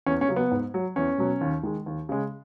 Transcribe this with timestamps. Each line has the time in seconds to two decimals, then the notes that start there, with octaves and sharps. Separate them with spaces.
0.06 E2 C#4
0.21 C#4
0.28 C#3 F#3
0.36 B3
0.51 G#2
0.74 F#3
0.96 E2 C#4
1.18 B2 F#3
1.41 D#2
1.63 D#3 G#3
1.86 D#2
2.09 C#3 G#3